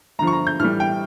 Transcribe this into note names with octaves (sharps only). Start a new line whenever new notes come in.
G2 D3 F3 A#5
C#6
A#5
G6
A2 E3 G3 F6
G5